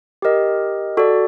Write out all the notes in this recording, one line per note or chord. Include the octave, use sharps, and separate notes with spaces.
G4 A#4 D#5
F#4 A4 D5